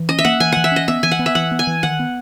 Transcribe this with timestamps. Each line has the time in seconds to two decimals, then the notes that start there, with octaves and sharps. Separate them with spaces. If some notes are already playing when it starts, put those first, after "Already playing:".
Already playing: E3
0.09 C#4 D#5
0.19 E5
0.25 A#3 F#5
0.40 E3 G#5
0.52 E3 F#5
0.64 E5
0.72 C#4 D#5
0.88 B3 E5
1.03 E3 G#5
1.11 F#5
1.19 B3
1.26 E5
1.35 E3 F#5
1.51 B3
1.59 G#5
1.67 E3
1.83 D#3 F#5
1.99 B3